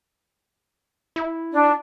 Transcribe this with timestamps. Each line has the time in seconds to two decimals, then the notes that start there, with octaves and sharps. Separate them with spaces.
1.16 E4
1.52 D4